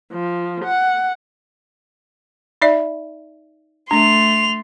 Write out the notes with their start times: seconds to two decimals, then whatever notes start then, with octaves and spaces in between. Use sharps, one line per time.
0.13 F3
0.65 F#5
2.62 D#4 D5 E5
3.91 A3 D4 C6 F7